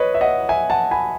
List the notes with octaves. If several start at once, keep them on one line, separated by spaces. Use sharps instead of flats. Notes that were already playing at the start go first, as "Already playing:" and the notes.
Already playing: B4 C#5 D#5
E5
D#5 F#5
E5 G#5
F#5 A5
G#5 B5